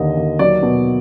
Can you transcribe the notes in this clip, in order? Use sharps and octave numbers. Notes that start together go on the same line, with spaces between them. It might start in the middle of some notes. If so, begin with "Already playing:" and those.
Already playing: D#2 D3 D#5
D#2
F#3 D5
B2